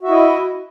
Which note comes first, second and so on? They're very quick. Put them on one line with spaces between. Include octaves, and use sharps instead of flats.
F#4 E5 E4 D#5